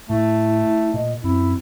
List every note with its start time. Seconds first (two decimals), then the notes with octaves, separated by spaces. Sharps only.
0.10 A2 A3 E4
0.94 A#2 D#5
1.24 F#2 C4 E4